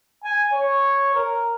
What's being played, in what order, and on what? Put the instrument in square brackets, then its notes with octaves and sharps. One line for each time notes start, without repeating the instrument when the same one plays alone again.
[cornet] G#5
C#5
A#4